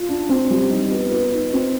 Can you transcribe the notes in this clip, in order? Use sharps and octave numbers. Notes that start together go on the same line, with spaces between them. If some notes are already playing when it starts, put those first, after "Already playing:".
Already playing: F4
D4
C4
G3
D#4
B3
B4
D#4
C4